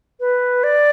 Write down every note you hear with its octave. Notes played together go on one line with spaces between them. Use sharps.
B4
D5